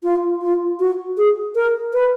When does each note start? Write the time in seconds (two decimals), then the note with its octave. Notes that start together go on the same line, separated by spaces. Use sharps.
0.03 F4
0.41 F4
0.80 F#4
1.17 G#4
1.55 A#4
1.93 B4